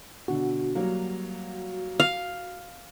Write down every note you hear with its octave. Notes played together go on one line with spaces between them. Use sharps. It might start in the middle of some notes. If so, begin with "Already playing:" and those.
B2 D3 F#4
F#3 G3 A#3
F5